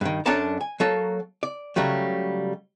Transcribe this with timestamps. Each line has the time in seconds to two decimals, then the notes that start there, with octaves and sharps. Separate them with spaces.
0.01 G2 D#3
0.26 F#2 D4 A4 C#5 A5 A#5
0.61 G#5
0.80 F#3 A#3 A4 C#5
1.43 D5
1.76 C#3 F#3 G3 A3